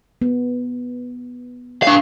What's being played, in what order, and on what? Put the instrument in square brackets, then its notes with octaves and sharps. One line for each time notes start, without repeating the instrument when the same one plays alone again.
[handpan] B3
[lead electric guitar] D4 F5